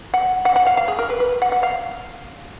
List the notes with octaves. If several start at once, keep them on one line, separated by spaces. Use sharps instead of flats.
F#5
F#5
F#5
F5
F5
G#4
A#4
B4
B4
F#5
F#5
F5